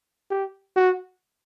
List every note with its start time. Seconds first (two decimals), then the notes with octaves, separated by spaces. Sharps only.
0.31 G4
0.77 F#4